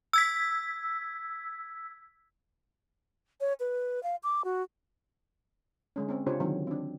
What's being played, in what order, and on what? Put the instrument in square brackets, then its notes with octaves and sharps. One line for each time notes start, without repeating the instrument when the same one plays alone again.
[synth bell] E6 G#6 B6
[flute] C#5
B4
F5
D6
F#4
[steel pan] D3 G#3 C#4
C4 C#4
C#3 D4 F4 G4 C5 C#5
D3 D#3 F#3 C4
C4 D4